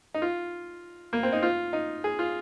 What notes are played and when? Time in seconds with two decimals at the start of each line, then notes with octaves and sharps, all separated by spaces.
0.14 D#4
0.22 F4
1.13 A#3
1.23 C4
1.33 D#4
1.43 F4
1.73 D#4
2.04 G#4
2.19 F4